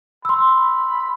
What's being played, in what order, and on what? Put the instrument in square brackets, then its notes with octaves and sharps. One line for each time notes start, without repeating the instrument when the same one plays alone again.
[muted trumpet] B5 [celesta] C6 E6